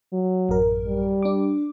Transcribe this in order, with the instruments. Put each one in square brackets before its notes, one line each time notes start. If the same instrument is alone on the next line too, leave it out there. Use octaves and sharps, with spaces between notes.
[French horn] F#3
[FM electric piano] A1 F#2 A#4
[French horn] G3
[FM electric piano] D4 D6